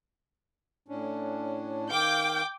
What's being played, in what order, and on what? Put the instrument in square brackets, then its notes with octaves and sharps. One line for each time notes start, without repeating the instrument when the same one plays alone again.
[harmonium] A2 C#4 D4
[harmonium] D#3 F5 [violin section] G5 D6 G6